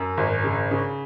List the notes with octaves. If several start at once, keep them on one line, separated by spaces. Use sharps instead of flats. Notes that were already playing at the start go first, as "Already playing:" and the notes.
Already playing: F#2
G#1
C#3
C#3